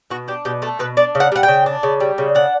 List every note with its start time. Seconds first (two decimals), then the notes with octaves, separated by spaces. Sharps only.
0.11 B2 F#4
0.28 D4 G4
0.45 B2 G4
0.62 A3 A4
0.79 B2 B4
0.97 D4 D5
1.15 C#3
1.20 F#5
1.32 G3 F#5
1.43 G5
1.48 C#3
1.66 D4
1.83 C#3
2.00 G3
2.18 C#3
2.35 D4 F#5